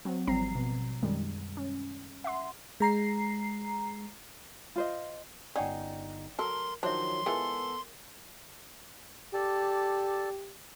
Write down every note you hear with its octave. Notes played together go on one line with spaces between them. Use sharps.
F#3 C4
G#1 F3 G3 C4 A#5 C7
B2
F#2 D#3 G3 G#3
C#4
E5 F#5 C6
G#3 A#5 C7
F4 C5 D#5
G1 C#4 D#4 D5 F#5 G5
F#3 A4 A#4 C6
D#3 F3 F#3 D4 C5 C#5 E5 C6
E3 G#3 B3 F4 A4 A#4
G4 A4 D5 A5